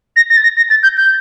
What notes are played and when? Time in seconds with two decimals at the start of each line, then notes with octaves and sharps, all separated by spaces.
0.16 A#6
0.30 A#6
0.37 A6
0.43 A#6
0.57 A#6
0.70 A6
0.83 G6
0.97 G6